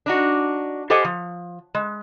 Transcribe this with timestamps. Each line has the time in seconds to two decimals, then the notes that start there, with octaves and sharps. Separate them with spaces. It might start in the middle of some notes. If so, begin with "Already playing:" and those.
0.06 D4 D#4 F#4
0.90 G4 A4 C5 D#5 F#5 G#5
1.04 F3
1.75 G#3